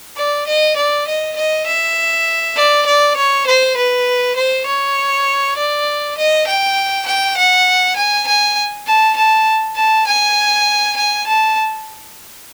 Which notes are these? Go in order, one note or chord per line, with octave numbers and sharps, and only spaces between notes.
D5
D#5
D5
D#5
D#5
E5
D5
D5
C#5
C5
B4
C5
C#5
D5
D#5
G5
G5
F#5
G#5
G#5
A5
A5
A5
G#5
G#5
A5